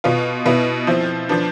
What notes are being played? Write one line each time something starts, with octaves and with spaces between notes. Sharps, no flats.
B2 B3 F4
B2 B3 E4
F3 C4 E4
F3 B3 D4